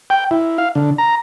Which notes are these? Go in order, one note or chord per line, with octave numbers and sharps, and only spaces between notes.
G5
E4
F5
D3
A#5